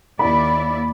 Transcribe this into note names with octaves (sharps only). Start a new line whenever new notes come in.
D#2 E4 D5 B5